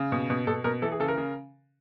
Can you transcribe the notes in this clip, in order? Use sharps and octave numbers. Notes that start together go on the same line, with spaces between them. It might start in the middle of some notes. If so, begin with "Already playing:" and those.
Already playing: C#3
B2
B2
B2 A4
B2 A#4
E3 A4
G#4
C#3 A4
A#4
C#3